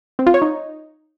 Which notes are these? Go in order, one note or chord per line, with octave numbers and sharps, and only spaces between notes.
C4
F4
C#5
D#4